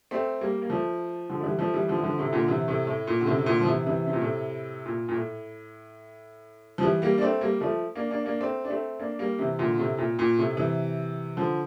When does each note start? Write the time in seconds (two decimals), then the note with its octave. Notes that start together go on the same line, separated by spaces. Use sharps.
0.11 A3 C4
0.41 G3 A#3
0.62 A#3
0.70 F3 A3
1.29 D3 F3
1.41 A3
1.44 E3 G3
1.59 F3 A3
1.74 E3 G3
1.88 D3 F3
1.98 E3
2.04 D3 F3
2.18 A2 C3
2.33 A#2 D3
2.48 C3 E3
2.68 A2 C3
2.87 A2
3.07 A#2
3.21 D3
3.26 A2 C3
3.37 C3
3.46 A#2 D3
3.61 F3
3.66 C3 E3
3.86 C3 E3
4.07 C3
4.13 A#2
4.21 A2 C3
4.86 A#2
5.09 A#2
5.14 A2
6.78 F3
6.82 E3 G3
7.02 G3 A#3
7.18 D4
7.22 A3 C4
7.41 G3 A#3
7.61 F3 A3
7.95 A#3 D4
8.11 A#3 D4
8.25 A#3 D4
8.41 A3 C4
8.64 D4
8.70 A3 C4
8.99 A#3 D4
9.19 G3 A#3
9.39 C3 E3
9.59 A#2 D3
9.78 A2 C3
9.98 A#2
10.19 A#2
10.38 A2 C3
10.57 C3 E3
11.37 D3 F3